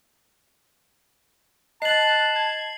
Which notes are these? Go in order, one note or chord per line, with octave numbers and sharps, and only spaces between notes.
D#5 A5 F#6 A6 C7 F#7
G#6